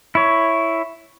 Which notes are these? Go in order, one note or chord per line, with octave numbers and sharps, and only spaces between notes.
E4 C#5